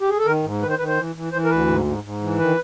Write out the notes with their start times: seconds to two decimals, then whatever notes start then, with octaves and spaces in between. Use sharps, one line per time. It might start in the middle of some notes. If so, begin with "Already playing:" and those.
0.01 G4
0.09 G#4
0.18 A4
0.26 D#3 A#4
0.43 G#2
0.62 D#3 B4
0.70 C5
0.79 D#3 B4
0.88 C5
0.97 E3
1.15 E3
1.32 E3 C5
1.44 A#4
1.50 D2 B4
1.68 G#2
1.85 G#2
2.03 G#2
2.21 E3
2.39 D#3 B4